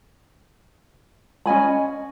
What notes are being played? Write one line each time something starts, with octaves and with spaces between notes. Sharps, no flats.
C#4 D#5 G#5 B5